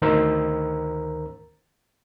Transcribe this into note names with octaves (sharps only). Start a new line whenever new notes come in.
D2 D#3 A#4 C5 A#5 E6